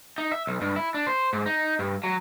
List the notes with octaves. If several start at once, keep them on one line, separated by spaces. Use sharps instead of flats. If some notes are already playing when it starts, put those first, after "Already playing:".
D#4
E5
B1
G2
E4
D4
C5
G#2
D#4
G2
F#3